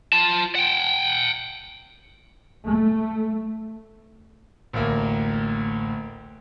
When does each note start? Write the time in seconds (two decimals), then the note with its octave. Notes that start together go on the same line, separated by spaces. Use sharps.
0.13 F4 A5
0.55 F#5 G5
2.64 A3
4.73 A1 D2 A#3